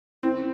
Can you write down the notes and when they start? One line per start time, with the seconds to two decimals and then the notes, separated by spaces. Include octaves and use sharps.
0.23 C4 E4